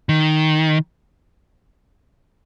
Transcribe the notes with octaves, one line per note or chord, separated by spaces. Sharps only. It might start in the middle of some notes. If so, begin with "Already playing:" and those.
D#3